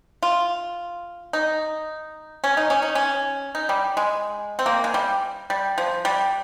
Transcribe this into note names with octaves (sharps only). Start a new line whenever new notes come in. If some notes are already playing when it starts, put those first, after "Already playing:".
F4
D#4
C#4
D#4
C#4
D#4
C#4
D#4
G3
G#3
C4
A#3
G#3
G3
G3
F3
G3